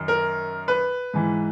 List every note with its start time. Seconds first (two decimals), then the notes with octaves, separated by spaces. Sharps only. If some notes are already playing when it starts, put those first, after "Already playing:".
Already playing: F#2 D#3
0.08 A#4
0.68 B4
1.14 G#2 E3